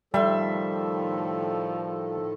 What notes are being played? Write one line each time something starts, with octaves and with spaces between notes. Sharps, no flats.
A2 D#3 F3 G3 A4 E5 C6